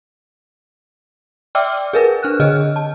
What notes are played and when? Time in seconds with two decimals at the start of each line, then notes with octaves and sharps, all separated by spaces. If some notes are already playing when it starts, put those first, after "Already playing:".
1.55 D5 E5 G5 D6 E6 F6
1.93 G#4 A#4 B4
2.23 D4 F6 F#6
2.40 D3 G#4 D#5 F6
2.76 A5